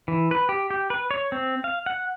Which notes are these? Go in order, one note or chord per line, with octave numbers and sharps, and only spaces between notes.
E3
B4
G4
G4
B4
C#5
C4
F5
F#5